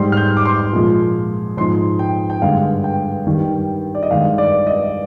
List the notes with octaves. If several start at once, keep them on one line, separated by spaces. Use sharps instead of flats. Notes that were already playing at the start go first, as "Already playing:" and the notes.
Already playing: G#2 G3 C6
F6
G6
D6
C6
A#2 F3 G#3
G#2 F3 G#3 C6
G5
G5
G2 D3 G#3 F5
G5
G2 D#3 G3
D5
D#5
G2 D#3 G#3 F5
D5
D#5